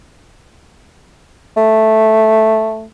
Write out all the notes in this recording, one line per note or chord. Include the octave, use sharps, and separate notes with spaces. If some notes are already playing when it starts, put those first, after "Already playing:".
A3